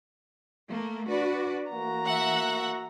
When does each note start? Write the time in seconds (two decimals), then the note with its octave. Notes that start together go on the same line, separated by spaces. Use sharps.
0.68 A3 A#3
1.09 D4 F#4 B4 D5
1.70 E3 A3 A#3 F#4 A#5
2.06 E5 F#5